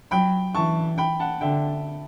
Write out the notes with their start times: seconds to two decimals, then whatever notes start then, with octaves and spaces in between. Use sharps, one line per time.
0.11 F#3 G5 B5
0.55 E3 A5 C#6
0.98 G5 B5
1.20 F#5 A5
1.41 D3 E5 G5